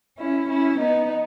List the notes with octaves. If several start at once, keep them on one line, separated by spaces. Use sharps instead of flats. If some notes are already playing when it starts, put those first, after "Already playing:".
C#4 E4
C#4 E4
B3 D#4